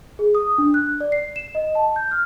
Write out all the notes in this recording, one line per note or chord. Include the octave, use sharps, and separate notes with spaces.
G#4
D#6
D4
F#6
D5
C7
E7
D#5
A5
G6
F6